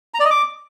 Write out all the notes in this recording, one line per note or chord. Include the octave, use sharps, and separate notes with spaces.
A#5
D5
D#5
D6